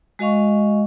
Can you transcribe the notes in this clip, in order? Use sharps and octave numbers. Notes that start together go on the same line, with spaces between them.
G#3 F#4 D#5 F5 C#6